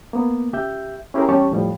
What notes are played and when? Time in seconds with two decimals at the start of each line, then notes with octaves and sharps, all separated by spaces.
0.13 A#3 B3
0.53 C#2 G4 E5 G6
1.14 C#4 E4 G4 G#4 A#4
1.29 E2 G3 C#4 G4 A5 C#6
1.51 F2 A2 F3 G3